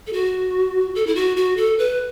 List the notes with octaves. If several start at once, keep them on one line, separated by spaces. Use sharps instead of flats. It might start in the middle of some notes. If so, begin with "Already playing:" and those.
A4
F#4
A4
E4
F#4
F#4
A4
B4